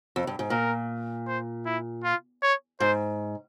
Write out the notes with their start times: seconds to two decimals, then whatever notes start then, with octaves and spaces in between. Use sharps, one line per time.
0.16 F2
0.27 G2
0.39 G#2
0.50 A#2 A#4
1.27 C5
1.66 E4
2.04 F4
2.42 C#5
2.80 G#2 C5